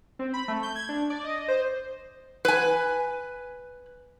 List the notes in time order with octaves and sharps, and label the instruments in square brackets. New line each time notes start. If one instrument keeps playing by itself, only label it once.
[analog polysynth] C4
B5
A3
G6
G#6
D4
D5
D#5
C5
[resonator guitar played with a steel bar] B4 G#5